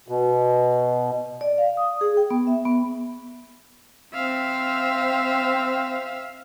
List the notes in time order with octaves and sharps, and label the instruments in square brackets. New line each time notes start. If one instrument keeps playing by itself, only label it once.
[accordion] B2
[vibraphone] D5
F5
D#6
G#4
G5
B3
E5
B3
[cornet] C4 [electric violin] E5 F5